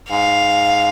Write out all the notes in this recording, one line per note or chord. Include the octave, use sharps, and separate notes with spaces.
G#2 F5